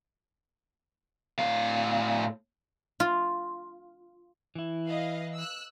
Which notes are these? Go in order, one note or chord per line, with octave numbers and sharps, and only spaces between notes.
A2 F5
F4
E3 E4
B4 D#5 F5
E6 F#6